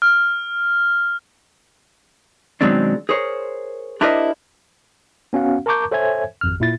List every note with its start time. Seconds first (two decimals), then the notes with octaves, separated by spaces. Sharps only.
0.02 F6
2.61 B2 D#3 F#3 G#3 C4 D4
3.09 G#4 A#4 C5 C#5
4.01 D4 E4 G4 A#4 C5 D#5
5.33 B3 C#4 F#4 F5 F#5
5.66 A#4 A5 A#5 C#6 D6 G6
5.91 A4 C5 C#5 E5 G#5 G#6
6.41 G#1 F2 F6
6.60 A#2 E4 A6